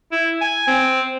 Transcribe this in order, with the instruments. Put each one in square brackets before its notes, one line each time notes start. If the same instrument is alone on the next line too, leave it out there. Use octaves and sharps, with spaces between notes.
[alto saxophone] E4
G#5
C4